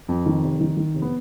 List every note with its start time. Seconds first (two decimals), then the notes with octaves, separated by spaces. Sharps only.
0.08 F2
0.26 D#3
0.43 F1
0.61 D#3
0.77 D#3
0.95 F1
1.02 B3